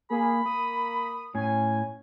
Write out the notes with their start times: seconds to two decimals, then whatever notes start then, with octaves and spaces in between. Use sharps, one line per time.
0.10 A#3 G#4 B5
0.46 A#3 D#6
1.35 A2 C#4 G#5